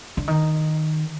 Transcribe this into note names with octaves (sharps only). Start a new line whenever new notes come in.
D3
D#3